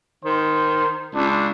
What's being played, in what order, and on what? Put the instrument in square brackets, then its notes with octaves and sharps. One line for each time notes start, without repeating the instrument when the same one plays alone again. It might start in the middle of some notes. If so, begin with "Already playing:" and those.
[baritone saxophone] D#3 [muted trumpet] C5
[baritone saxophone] C#2 [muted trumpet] D4